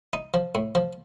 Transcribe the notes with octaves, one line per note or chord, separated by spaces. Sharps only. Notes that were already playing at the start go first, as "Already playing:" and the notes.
D#4
F3
A2
F3